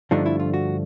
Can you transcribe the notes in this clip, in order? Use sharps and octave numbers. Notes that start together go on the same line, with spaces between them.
G2 D3 F3 A3 D4 D#4
E4
F4
F#4